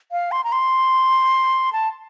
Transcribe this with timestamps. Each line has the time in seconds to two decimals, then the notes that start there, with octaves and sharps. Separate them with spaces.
0.12 F5
0.32 C6
0.44 A#5
0.52 C6
1.73 A5